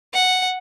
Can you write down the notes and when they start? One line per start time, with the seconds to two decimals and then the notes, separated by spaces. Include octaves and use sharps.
0.14 F#5